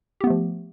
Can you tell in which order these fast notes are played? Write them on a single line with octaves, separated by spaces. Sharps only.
G4 B3 A3 F3